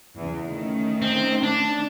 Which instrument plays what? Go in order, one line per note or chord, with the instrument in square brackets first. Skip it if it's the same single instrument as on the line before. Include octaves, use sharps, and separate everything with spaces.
[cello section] E2 C#3
D#3 A3 C#4
[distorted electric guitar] C4
D4